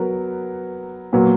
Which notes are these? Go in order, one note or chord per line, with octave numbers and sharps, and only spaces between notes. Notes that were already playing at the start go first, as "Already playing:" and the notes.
Already playing: F#3 B3 A#4
A#2 F#3 B3